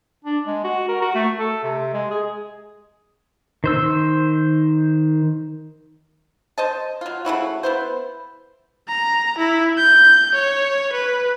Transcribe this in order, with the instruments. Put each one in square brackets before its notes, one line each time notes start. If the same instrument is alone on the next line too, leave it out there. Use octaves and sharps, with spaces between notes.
[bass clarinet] D4
G#3
F#4
A#4
F#4
A3
A4
C3
G#3
G#4
[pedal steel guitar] D#3 C5 E6
[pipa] C5 D#5 A5
F#3 F4
C#3 A3 E4 F#4
B3 E4 C5
[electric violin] A#5
E4
G6
C#5
B4